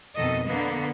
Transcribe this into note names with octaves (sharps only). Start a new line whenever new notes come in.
F2 B2 D#3 A4 D#5
D3 A#3 B3